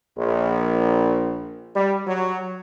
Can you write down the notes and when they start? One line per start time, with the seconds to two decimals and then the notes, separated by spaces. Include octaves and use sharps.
0.18 A#1
1.75 G3
2.06 F#3